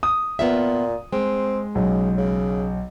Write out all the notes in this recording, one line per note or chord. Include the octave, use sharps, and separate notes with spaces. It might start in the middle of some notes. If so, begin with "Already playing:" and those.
D#6
A#2 B3 F4 E5
G#3 C4
B1 C#3
C#3